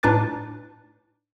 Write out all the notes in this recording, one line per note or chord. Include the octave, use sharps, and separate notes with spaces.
A2 D4 D#4 B4 D6 A6